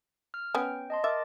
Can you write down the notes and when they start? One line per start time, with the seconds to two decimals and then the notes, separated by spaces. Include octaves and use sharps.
0.34 F6
0.55 B3 C#4 G5
0.90 D#5 A5 C6
1.04 A#4 E5 D6 A6